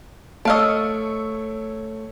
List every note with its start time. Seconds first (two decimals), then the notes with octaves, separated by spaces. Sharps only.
0.45 A3 C#5 D#5 F5 A5 C#6 E6 D7